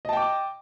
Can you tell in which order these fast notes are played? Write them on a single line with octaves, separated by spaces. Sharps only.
D#5 A5 G5 D6